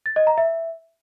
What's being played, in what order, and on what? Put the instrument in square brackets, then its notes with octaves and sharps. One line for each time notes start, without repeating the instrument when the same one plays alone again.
[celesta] A6
D#5
A#5
E5